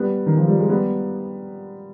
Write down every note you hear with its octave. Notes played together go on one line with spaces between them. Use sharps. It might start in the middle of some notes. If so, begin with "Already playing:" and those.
Already playing: G3 B3
D#3
F3
G3
G#3
G3 B3